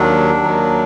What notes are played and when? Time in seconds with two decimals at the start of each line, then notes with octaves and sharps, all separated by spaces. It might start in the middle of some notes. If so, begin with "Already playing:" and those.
Already playing: D#2 D#3 F#3 D4
0.43 D#2 D#3 F#3